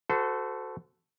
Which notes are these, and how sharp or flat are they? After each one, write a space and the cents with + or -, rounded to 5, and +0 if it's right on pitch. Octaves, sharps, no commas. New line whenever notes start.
F#4 +0 A4 +0 C5 -35